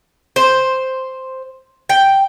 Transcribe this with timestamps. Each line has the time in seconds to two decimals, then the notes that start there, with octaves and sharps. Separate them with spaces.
0.36 C5
1.89 G5